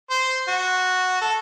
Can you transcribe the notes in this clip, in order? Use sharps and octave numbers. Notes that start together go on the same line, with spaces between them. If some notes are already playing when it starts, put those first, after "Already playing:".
C5
F#4
A4